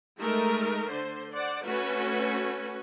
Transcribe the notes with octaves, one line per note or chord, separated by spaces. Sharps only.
G#3 A3 D#4 A#4
D3 C5 C6
C5 D5 F#5
A3 C#4 F#4 B4